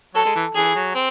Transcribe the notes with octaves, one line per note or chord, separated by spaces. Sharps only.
F#3 A4
G#3
E3
E3 G#4
F#3
C4